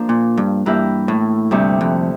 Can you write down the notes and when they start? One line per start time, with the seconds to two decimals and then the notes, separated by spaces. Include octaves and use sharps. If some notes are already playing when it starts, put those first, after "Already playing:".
Already playing: F3 A#3 D4
0.09 A#2
0.37 G2
0.66 G2 E3 A#3 E4 G4 A#4
1.08 A2
1.51 D2 G2 C3 G3
1.81 F2